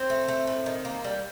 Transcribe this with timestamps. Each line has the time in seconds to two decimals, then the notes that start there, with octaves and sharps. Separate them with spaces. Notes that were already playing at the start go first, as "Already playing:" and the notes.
Already playing: C4 C5
0.10 A3
0.28 A3
0.47 A2
0.66 D#3
0.85 A#3
1.04 G3